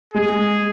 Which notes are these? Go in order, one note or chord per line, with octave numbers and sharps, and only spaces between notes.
G#3 G#4